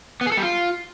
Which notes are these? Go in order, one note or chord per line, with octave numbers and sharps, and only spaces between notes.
B3
G#4
A4
G3
F4